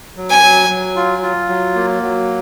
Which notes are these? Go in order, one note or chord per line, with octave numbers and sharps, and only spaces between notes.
F#3
G#5
F#3
F#3
F4
F4
F#3
A#3
F#3